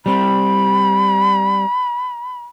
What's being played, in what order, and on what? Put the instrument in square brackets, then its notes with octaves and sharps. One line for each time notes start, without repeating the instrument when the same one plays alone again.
[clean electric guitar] G3 C4 [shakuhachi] B5